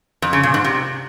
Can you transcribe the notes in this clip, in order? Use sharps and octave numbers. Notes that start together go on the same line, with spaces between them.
F2
C#3
A#2
G#2
C3